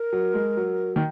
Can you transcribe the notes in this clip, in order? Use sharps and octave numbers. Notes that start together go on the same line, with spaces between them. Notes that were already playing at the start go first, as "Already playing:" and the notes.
Already playing: A#4
F#3
G#3
F#3
D#3